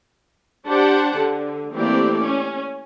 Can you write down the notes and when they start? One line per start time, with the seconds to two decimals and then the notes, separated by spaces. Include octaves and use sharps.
0.67 D4 G4 C5 F#5 A5
1.17 D3
1.74 E3 A3 A#3 C4 G4 D5
2.21 C#4